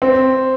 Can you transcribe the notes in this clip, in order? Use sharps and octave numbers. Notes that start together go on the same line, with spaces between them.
C4